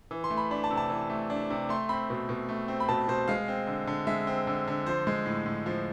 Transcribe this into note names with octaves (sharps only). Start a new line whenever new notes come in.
E3
C6
A3
B5
D4 B5
A5
C3
A5
E3
A3
D4
C3
A3 C6
C4 B5
B2
B2
A3
C4
B5
B2 A5
B2 C5
G#3 F5
C4
D3
D3
G#3 E5
C4
D3
D3
F3 C5
G#3
A2
A2
F3